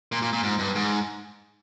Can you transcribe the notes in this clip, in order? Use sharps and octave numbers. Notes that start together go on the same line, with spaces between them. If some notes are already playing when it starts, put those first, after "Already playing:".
A#2
A#2
A#2
G#2
G2
G#2